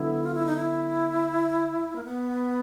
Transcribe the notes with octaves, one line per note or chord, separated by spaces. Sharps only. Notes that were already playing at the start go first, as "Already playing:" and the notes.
Already playing: D3 F#3 B3 E4
F4
E4
D#4
E4
A#3
B3